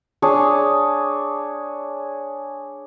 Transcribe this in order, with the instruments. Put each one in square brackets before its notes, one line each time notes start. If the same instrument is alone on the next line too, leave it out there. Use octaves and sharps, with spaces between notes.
[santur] D4 G#4 C#5 A5